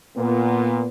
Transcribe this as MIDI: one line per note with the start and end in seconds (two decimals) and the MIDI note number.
0.17 0.87 46
0.17 0.87 59